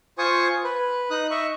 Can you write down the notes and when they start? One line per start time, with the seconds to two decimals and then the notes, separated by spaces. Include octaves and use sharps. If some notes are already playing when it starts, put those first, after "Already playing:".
0.18 F4 C5 G#5 C#6 D#6
0.64 B4
1.11 D#4 D#6 F#6
1.30 D#5 E5 C#6